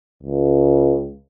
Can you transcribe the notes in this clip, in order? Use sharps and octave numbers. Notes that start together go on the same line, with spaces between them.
C#2